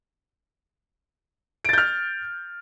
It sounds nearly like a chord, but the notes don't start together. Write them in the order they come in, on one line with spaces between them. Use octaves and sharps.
D7 A6 G6 F6